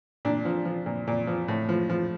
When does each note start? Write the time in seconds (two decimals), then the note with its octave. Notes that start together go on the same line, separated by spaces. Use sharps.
0.25 A#2 D4
0.45 F3
0.65 F3
0.86 A#2
1.07 A#2
1.27 F3
1.48 A2
1.69 F3
1.89 F3